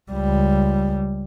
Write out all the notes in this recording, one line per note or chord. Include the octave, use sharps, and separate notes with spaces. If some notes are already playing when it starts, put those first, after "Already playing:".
C#2 G3